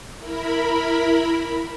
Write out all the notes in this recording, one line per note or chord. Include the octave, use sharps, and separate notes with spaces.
E4 A#4 B5